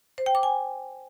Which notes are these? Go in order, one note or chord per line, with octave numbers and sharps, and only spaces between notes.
C5
G5
D6
G#5